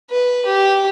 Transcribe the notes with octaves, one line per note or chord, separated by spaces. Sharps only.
B4
G4